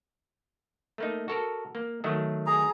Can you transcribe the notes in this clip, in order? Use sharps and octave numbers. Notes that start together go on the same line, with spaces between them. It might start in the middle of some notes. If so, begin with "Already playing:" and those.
A3 A#3 D#4
F#4 A4 A#4
A#3
D#3 F#3 A3
G#4 A#5